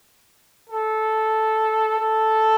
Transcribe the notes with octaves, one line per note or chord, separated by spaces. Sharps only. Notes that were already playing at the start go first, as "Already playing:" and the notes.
A4
A4